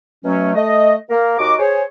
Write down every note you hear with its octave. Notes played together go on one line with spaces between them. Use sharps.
B2 F#3 A3 C#4
A3 D#5
A#3 A#4
D#2 D#4 F#4 D#5 D6
G#4 C5 C#5